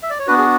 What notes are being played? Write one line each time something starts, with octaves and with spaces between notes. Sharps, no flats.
E5
D5
C#5
B3 D4 F#4 B4
G#4